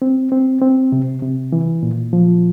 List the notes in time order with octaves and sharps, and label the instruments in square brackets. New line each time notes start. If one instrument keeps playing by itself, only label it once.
[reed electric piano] C4
C4
C4
C3
C3
E3
A#2
F3